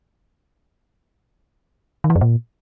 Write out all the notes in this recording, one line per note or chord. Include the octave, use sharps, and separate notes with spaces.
D#3
E3
F#2
A#2